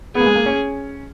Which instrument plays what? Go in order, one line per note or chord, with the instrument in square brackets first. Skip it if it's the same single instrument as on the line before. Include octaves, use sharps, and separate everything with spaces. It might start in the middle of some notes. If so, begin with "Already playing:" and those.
[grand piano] B3 [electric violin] G#4
[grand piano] A#3
G#3
A#3
C#4